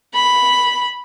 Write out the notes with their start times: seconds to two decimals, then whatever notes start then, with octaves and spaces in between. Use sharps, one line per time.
0.15 B5